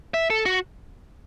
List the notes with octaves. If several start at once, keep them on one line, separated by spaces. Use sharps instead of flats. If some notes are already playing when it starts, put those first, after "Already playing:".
E5
A4
F#4